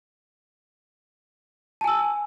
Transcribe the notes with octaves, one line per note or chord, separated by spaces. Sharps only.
G#5 A5 E6